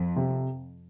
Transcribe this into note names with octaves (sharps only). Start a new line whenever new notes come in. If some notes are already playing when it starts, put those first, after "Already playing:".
Already playing: F2
C3